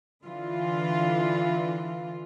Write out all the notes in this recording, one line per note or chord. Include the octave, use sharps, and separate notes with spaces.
D3 E3 F4